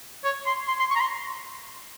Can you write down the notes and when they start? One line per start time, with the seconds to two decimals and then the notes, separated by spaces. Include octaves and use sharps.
0.24 C#5
0.46 C6
0.68 C6
0.79 C6
0.90 C#6
0.96 A#5
1.01 C6